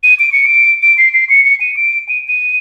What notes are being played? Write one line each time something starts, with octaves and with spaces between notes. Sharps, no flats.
D#7
D7
C#7
D7
D7
C7
C7
C#7
C#7
D#7
D7
D#7
D#7